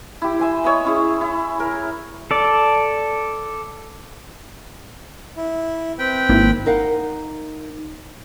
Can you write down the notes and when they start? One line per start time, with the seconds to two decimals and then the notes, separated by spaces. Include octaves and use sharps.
0.22 E4 G4
0.40 E5 G#5 C6
0.64 C#5 D#5 E5 B5
0.85 C#4 E4 G#4
1.21 E4
1.60 A#4
2.31 A4 D5
5.37 E4
5.99 C4 B4 G5
6.29 G#1 A#3 E4
6.66 D#4 A#4 F5 F#5